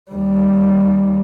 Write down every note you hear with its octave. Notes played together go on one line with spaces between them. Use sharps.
D#2 G3